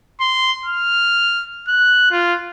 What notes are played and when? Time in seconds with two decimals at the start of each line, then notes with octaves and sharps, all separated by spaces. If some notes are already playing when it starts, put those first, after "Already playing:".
0.21 C6
0.66 F6
1.68 F#6
2.11 F4